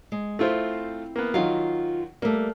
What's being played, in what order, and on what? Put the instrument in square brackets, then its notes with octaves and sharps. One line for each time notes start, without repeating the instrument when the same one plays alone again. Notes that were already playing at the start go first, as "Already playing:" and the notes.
[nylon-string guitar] G#3
[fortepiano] A3 F4 C5 [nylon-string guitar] C4 E4 E5
[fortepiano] A#3 B3
[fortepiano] D#3 F#3 [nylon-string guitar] F4 D#5 F5
[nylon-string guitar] G3 A3 [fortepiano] A#3